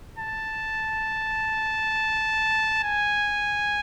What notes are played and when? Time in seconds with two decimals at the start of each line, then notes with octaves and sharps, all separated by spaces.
0.18 A5
2.84 G#5